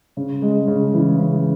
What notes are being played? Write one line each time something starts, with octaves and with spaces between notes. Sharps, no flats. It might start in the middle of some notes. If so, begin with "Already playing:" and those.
C#3
G#3
C#3
E3
C#3